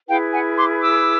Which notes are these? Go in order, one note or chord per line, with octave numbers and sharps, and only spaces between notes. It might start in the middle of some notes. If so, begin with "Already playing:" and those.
E4 G#4 B4 F5 G5
F#5 G#5
C6 D6
D6 E6